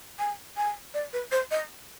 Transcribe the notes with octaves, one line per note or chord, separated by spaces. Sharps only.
G#5
G#5
D5
B4
C5
D#5